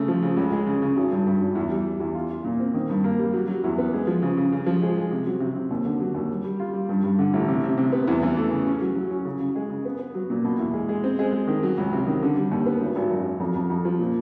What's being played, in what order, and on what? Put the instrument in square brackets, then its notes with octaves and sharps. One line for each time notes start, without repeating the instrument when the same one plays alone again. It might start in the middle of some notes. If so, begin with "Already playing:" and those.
Already playing: [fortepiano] C#3 A3
F3
C#3
C#2
G#3
C#3
C#3
G#1
G2
G2
G#1
E2
G3
G3
E2
F4
F4
A#2
C4
D#3
G2
A#3
G3
F#3
F#3
E2
B3
G#3
F3
C#3
C#3
C#3
F3
G#3
G#3
C3
F#3
C3
C3
D#2
D3
F#3
D#2
G3
G3
F4
G3
G2
G2
D3
A1
C3
C3
C3
B3
E2
E3
A3
C#3
C#4
F#3
F#3
C#4
C#3
C#3
G#3
C#3
B3
B3
F#3
A#2
B2
E2
G#3
G#3
C4
G#3
G#3
D#3
F#3
C#2
C3
D#3
D3
G3
D#2
B3
G#1
G#1
F#2
G#1
F2
F2
F2
F3
A#2